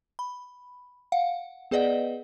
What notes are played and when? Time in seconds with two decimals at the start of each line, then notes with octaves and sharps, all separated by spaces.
0.19 B5
1.12 F5 F#5
1.71 B3 G#4 B4 D5 D#5 F#5